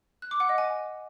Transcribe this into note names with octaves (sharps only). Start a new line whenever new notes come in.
F#6
D6
F#5
D#5
G#5